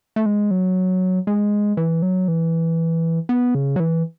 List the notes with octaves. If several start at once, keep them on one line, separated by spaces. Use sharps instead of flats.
A3
G#3
F#3
G#3
E3
F#3
E3
B3
C#3
F#3
E3